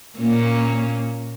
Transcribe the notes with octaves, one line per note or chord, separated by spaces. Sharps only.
A#2 A#3 C#4